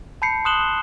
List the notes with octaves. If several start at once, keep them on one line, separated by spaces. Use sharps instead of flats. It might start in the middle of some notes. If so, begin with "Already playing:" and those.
A5 B5 G6 C7 C#7
C6 D#6 F#6 E7 F#7 G7